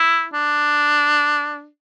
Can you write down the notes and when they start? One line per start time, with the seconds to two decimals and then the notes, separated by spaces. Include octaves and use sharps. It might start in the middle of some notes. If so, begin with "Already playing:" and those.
Already playing: E4
0.33 D4